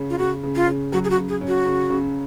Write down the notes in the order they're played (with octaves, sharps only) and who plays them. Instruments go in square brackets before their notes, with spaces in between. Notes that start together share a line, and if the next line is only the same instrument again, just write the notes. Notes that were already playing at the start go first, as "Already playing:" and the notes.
Already playing: [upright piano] C#3 C#4
[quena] F4
[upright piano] C#3 [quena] F#4
[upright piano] C#3
[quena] F4
[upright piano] C#3
[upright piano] F#3 [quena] F#4
[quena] G#4
F#4
[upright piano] C#3
[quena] G#4
[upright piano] C#4
[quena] F#4
[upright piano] C#3
C#3